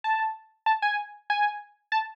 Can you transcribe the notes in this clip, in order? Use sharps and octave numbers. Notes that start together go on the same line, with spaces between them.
A5
A5
G#5
G#5
A5